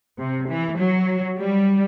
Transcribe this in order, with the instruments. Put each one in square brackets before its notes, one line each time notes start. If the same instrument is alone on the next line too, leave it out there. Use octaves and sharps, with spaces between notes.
[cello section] C3
E3
F#3
G3